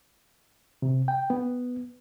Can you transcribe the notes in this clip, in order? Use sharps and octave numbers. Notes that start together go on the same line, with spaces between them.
C3
G5
B3